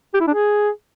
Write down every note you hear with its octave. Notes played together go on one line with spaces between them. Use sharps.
G4
E4
D4
G#4